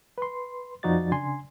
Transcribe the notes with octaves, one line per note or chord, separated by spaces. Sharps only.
B4 C6
F2 F3 D#4 F#4 D5 A6
C#3 D4 G#5 C6